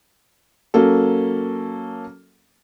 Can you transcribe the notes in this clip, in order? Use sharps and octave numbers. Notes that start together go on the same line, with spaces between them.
F#3 A#3 C#4 A4